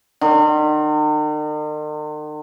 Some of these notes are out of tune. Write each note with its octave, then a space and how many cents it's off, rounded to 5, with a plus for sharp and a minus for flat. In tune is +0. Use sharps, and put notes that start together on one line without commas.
D#3 -45